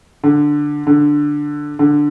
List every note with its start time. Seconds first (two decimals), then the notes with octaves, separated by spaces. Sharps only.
0.24 D3
0.87 D3
1.79 D3